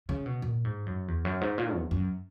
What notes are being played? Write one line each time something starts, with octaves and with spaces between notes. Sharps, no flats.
C#3
B2
A#2
G#2
F#2
E2
F#2
G#2
A#2
E2
F#2